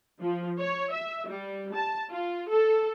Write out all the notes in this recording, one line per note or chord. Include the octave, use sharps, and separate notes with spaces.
F3
C#5
E5
G3
A5
F4
A4